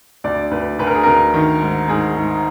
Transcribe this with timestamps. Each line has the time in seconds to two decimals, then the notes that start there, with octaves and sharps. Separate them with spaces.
0.24 D2 D5
0.51 D2 B4
0.79 D2 B4
0.87 A#4
0.95 G#4
1.03 D2 A#4
1.34 D#3
1.61 G#2
1.88 G#2 G#4
2.16 G#2